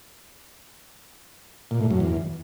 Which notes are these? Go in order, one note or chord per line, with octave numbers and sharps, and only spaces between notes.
A#2
A2
F#2
E2